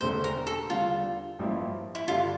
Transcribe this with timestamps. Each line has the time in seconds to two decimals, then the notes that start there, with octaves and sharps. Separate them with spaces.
0.01 E1 E2 D3 A3 C5
0.24 A#4
0.47 A4
0.70 E2 D3 G3 F4
1.39 A1 G2 F3 A#3 E4
1.95 E4
2.07 G2 D3 G3 F4